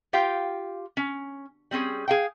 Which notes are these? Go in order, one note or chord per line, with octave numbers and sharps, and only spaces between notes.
F4 G4 F5 G5
C#4
G3 C4 C#4 G#4
G#4 F5 G5